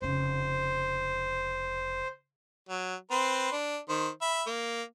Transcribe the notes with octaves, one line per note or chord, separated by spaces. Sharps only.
F1 C#3 C5
F#3
C4 B4 C6
D4
D#3 C5
E5 B5
A#3